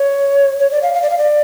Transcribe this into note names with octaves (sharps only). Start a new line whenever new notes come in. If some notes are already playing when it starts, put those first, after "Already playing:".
Already playing: C#5
C#5
D5
F5
F5
D5
F5
D5